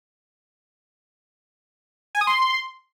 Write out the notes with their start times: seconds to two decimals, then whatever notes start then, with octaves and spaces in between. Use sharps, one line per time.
2.15 G#5
2.21 D#6
2.27 C6